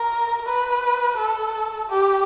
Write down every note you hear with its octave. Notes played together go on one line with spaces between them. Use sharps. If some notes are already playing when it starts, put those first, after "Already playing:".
Already playing: A#4
B4
A4
G4